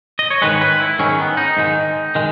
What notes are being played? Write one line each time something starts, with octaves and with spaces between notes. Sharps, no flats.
D#5
C#5
G#2 D#3 G#3 B4
C#5
B4
E4
G#2 D#3 G#3 C#4
B3
D#4
G#2 D#3 G#3
D#3 G#3